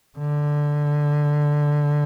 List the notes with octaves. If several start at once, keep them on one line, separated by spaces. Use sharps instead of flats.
D3